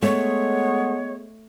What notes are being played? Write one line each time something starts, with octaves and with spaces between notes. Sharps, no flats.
G#3 A3 B3 C#5